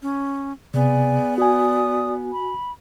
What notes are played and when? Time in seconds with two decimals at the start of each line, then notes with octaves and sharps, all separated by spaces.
0.02 C#4
0.74 C3 B3 G#4 D5 G#5
1.38 F#4 D5 G#5 D#6
2.31 B5